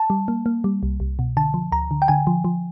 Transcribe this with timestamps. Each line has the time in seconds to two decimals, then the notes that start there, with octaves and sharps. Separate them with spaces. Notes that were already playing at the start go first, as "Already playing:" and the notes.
Already playing: A5
0.10 G3
0.28 A#3
0.46 A#3
0.64 G3
0.83 C2
1.00 C2
1.19 B2
1.37 D3 A5
1.54 F3
1.72 D2 A#5
1.91 D3
2.02 G5
2.08 D3 G#5
2.27 F3
2.44 F3